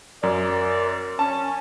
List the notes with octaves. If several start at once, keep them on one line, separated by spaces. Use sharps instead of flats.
F#2 A#4 D5
C#4 A5